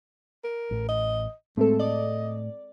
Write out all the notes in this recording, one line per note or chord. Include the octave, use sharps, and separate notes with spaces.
A#4
A1 A2
D#5
A2 G#3 A3 C4 A4
D5 D#5